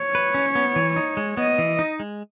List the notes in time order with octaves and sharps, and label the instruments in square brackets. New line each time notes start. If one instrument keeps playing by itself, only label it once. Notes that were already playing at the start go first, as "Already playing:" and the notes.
Already playing: [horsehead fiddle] C#5
[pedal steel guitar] B4
C#4
B3
E3
D#4
G#3
[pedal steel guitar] B3 [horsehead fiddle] D#5
[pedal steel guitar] E3
D#4
G#3